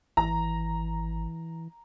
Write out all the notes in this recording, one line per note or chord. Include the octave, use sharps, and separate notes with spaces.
G#1 E3 A#5